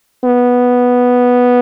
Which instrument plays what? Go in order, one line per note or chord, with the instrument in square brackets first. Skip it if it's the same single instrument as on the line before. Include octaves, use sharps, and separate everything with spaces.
[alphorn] B3